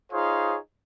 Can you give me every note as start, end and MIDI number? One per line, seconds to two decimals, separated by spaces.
0.12 0.57 63
0.12 0.57 65
0.12 0.57 68
0.12 0.57 72
0.12 0.57 73
0.12 0.57 77